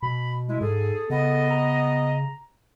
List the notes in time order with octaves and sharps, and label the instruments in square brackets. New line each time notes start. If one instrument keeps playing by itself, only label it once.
[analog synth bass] B2 [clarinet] B5
[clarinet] G#3 [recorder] E4
[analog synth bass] G#2 [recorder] G#4 [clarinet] A4
[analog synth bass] C#3 [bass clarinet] B3 [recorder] D#5
[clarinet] A#5